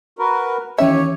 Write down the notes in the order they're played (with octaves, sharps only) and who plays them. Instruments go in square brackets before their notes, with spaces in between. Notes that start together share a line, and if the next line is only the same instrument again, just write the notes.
[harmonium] F#4 A#4 B4
[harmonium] D#2 G4 [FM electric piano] E3 C#4 C#6 [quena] C#5 [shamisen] E5